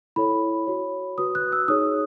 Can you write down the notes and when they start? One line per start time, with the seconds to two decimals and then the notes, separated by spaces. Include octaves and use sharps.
0.16 E4 A4 C#5 B5
0.67 F#4 C#5
1.18 F#4 B4 D#6
1.35 F#6
1.52 E6
1.68 D#4 G#4 C#5 D#6